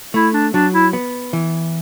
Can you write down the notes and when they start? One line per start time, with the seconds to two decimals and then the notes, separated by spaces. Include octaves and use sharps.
0.14 A3 E4
0.33 D4
0.53 F#3 D4
0.73 E4
0.93 B3
1.33 E3